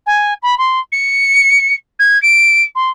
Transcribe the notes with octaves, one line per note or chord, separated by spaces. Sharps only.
G#5
B5
C6
C#7
G#6
D7
C6